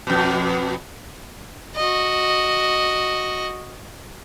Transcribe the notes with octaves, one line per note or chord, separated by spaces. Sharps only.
F2 B2
F#4 D#5